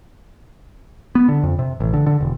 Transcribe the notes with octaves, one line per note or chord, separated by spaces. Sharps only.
B3
D3
F2
C3
A1
D3
D3
E1